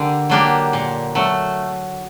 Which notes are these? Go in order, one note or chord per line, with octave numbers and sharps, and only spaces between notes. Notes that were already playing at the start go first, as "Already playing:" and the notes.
Already playing: D3 A#3 D4 G4
F#3 A#3 D4 G4
A#2
F#3 A3